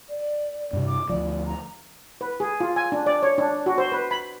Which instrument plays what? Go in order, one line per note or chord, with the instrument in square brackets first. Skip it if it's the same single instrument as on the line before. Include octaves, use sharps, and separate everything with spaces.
[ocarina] D5
[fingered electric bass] G2 C3
[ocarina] D6
[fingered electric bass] D2 F3 [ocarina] D5
[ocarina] A#5
[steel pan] B4
G#4
F4
G#5
D4
D5
C#5
D4
F#4
C5
B4
B5